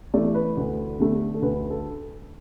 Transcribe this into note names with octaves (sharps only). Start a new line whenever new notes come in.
E3 A3 D5
B4
D2
D3 A3
A4
D2 B4
A4